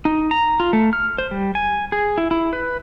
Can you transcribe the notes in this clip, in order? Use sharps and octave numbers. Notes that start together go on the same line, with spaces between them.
D#4
A#5
F4
A3
F6
C5
G3
G#5
G#4
E4
E4
B4